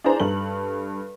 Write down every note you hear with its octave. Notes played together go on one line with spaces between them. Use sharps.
D4 E4 G#4 B4 C5 A#5
G2 A4 F#7